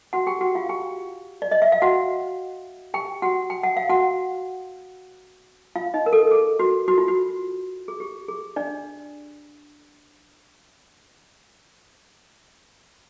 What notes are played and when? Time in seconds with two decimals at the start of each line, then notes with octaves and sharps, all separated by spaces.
0.13 F#4 F#5
0.27 G4 G5
0.41 F#4 F#5
0.55 F4 F5
0.69 G4 G5
1.42 D5
1.52 D#5
1.62 E5
1.72 F5
1.82 F#4 F#5
2.94 G4 G5
3.22 F#4 F#5
3.50 G5
3.64 F#5
3.77 F5
3.89 F#4 F#5
5.76 F4 F5
5.94 D#4 D#5
6.06 A#4
6.13 A4
6.31 G#4
6.59 F#4
6.88 F#4
6.98 F4
7.08 F#4
7.88 G#4
8.00 G4
8.28 G#4
8.56 D4 D5